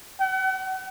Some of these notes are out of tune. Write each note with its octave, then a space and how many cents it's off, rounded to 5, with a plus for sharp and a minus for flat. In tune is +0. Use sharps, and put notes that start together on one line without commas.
F#5 +40